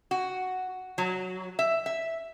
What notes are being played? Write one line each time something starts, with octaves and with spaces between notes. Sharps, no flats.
F#4
F#3
E5
E5